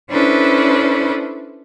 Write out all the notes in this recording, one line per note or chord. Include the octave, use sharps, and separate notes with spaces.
C#4 D4 E4 A4 B4 C5